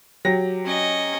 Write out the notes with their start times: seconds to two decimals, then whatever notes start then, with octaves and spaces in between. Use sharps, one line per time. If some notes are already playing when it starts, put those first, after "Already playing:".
0.25 F#3 G4 A#6
0.65 C#4 D#5